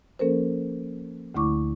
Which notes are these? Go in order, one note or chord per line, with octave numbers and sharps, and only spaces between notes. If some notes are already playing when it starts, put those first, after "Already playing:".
F3 A#3 C#4 A4 A#4 C5
D2 D3 A3 E4 C#6 D6